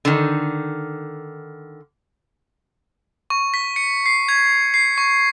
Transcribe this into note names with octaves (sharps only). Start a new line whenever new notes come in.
D3 D#3
C#6
B6
C#7
C7
G#6
C7
C#6